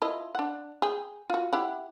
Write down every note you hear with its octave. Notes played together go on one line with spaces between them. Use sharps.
E4 F4 D#5
D4 F#5
G#4 G5
F4 F#4
E4 G4 F#5